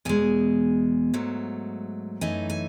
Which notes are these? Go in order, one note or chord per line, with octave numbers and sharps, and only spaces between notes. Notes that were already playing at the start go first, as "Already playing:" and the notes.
E2 B2 G#3 G#5
G#2 F#3 A3
F#2 E3 A3 D#4 G#5
G#5